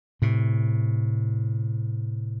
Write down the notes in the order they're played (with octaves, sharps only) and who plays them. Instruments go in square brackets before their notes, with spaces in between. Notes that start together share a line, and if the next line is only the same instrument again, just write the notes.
[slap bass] A2 C3